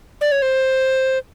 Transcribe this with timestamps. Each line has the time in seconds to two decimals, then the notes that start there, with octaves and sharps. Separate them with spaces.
0.21 D5
0.32 C#5
0.42 C5